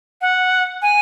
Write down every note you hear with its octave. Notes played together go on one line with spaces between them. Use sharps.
F#5
G#5